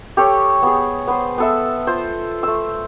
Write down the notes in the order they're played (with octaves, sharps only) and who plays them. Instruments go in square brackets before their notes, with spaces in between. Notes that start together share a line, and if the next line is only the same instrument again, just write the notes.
[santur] G4 A4 C#5
B3 G#4
B3 C5
B3 A4 E5
F4 C5
A3 E6